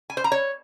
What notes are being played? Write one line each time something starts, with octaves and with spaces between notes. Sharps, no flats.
G#5
C5
A#5
C#5